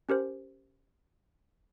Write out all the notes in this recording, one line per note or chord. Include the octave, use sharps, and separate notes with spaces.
C#4 G4 A#4 C5